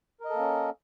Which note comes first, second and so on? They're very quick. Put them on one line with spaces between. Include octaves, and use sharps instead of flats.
A#4 D#5 A4 A#3 C#4